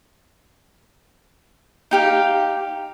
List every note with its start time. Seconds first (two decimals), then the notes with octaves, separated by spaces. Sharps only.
1.91 D#4 G4 F5